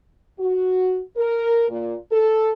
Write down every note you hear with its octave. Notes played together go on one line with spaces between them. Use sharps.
F#4
A#4
A#2
A4